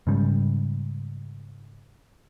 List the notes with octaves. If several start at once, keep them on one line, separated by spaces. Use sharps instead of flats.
G#2 C#3 G3